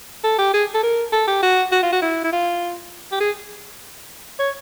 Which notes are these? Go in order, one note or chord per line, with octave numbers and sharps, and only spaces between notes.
A4
G4
G#4
A4
A#4
A4
G4
F#4
F#4
F4
F#4
E4
E4
F4
G4
G#4
C#5